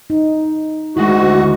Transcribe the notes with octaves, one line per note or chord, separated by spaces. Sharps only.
D#4
D2 D#3 G#3 E4 F#4